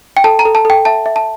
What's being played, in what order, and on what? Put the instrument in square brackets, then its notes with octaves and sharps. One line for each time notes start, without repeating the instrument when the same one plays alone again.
[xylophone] G5
A4 A5
A#5
A4
A5
A4 G5
E5 A5
E5
A5